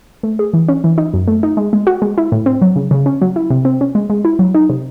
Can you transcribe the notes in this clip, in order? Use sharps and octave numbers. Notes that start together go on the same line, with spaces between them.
A3
G#4
E3
C#4
E3
D#4
F#2
A3
D#4
G#3
G#3
F#4
G#3
E4
A2
C4
F#3
C#3
C#3
C#4
F#3
E4
C3
C4
C#4
G#3
G#3
E4
F#3
D#4
C3